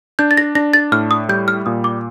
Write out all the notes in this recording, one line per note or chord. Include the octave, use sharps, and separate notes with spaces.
D4 G6
A6
A#6
D4 A#6
A6
A2 F6
D#6
G3 G6
F6
A#2 D#6
D6